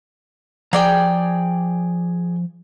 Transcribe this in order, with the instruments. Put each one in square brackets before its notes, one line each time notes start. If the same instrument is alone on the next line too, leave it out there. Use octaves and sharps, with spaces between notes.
[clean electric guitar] F3 A#5 [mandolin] G#4 D5 G5